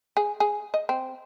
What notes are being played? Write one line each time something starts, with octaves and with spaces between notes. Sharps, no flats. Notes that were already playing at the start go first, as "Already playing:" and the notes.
G#4
G#4
D#5
C4